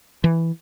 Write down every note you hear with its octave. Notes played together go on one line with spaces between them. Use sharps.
E3